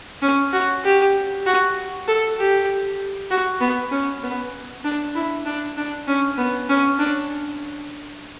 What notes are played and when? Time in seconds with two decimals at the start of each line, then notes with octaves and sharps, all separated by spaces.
0.22 C#4
0.53 F#4
0.84 G4
1.46 F#4
2.08 A4
2.39 G4
3.31 F#4
3.61 B3
3.91 C#4
4.23 B3
4.84 D4
5.15 E4
5.46 D4
5.77 D4
6.07 C#4
6.38 B3
6.69 C#4
6.99 D4